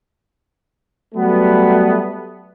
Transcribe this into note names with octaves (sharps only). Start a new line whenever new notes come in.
F#3 G3 A3 B3